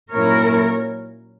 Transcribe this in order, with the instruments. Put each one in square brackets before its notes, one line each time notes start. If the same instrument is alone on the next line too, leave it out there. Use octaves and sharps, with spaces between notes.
[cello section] A#2 F#3 A#3 C#4 E4 A#4 C#5